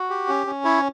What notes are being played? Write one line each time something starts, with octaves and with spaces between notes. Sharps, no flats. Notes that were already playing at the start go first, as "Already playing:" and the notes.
Already playing: F#4
G4
C#4
C#4
E4 C#5